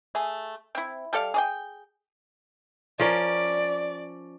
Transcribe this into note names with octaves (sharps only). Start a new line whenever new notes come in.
A3 G#4
C4 E4
G3 A4 D5 F5
G#4 D5 G5
F3 C#4 A#4 D5